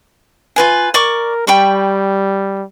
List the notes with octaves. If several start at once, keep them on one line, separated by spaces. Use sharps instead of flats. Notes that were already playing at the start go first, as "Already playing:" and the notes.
F4 B4 G#5
A#4 D5 C#6 D6
G3 G5 B5 C#6